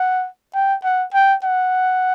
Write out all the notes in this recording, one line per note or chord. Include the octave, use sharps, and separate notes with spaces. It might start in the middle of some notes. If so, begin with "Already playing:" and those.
Already playing: F#5
G5
F#5
G5
F#5